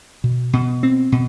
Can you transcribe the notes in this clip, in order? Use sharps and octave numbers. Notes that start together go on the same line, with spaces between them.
B2
B2
C4
B2